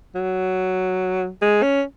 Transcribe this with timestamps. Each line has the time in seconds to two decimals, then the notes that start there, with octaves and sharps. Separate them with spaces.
0.15 F#3
1.42 G#3
1.63 C#4